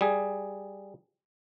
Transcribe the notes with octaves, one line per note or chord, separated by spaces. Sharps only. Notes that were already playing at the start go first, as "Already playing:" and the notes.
G3 G#4